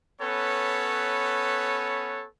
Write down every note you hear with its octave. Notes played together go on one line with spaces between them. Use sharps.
B3 C#4 A4 B4 C#5